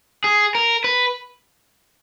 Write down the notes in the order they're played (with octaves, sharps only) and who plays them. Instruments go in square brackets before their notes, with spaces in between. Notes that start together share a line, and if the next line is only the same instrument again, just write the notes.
[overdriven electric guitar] G#4
A#4
B4